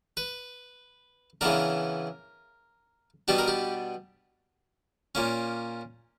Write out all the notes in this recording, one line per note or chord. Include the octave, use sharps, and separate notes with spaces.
B4
C#3 E3 B3 D4 A#4
B2 G3 B3 D4 G4
A#4
G4
A#2 A#3 C#4